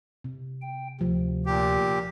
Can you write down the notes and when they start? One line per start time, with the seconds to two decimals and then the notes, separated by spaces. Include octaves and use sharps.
0.24 C3
0.62 G5
1.01 D2 C3 F3
1.46 A#2 G4